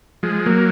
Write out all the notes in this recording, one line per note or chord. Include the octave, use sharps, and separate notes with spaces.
F3 G#3
F#3 A#3